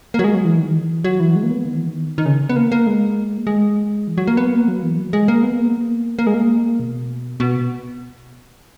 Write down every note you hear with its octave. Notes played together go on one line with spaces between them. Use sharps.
A#3
F#3
G#3
F#3
E3
D#3
E3
F#3
E3
G#3
A#3
B3
D#3
E3
D#3
D#3
C#3
B3
A#3
A#3
G#3
A#3
G#3
E3
F#3
A#3
B3
A#3
F#3
E3
F#3
G#3
A#3
B3
A#3
A#3
G#3
A#3
B2
B2